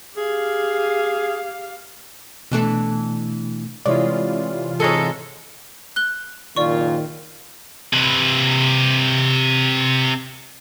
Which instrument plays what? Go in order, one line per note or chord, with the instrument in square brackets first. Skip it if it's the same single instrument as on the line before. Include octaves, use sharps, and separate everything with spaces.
[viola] G4 F5 [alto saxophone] G#4
[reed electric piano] B2 A3 [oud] E3 D4 A4
[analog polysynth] C3 E3 F4 [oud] G#3 [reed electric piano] E4 C#5 D5
[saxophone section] G#2 G#3 A4 [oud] G#4 C#5
[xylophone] F#6 G7
[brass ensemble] F#1 A#2 F4 [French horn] D#3 [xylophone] D5 C#6
[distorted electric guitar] C3 B4